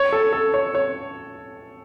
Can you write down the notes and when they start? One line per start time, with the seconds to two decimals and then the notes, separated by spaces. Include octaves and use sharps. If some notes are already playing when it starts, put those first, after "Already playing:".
Already playing: C#5
0.12 A4
0.33 A4
0.54 C#5
0.75 C#5